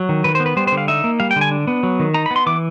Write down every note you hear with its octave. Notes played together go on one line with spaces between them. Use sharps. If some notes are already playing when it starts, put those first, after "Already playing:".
Already playing: F#3
D#3
D#3 B4
C5
B3
B4
G3 C5
C5
D3
F5
D#4 E5
A#3
G3 F5
G5
D3
G#5
D4
B3
F#3
D#3
D#4 A#5
B5
B3
C6
E3 D6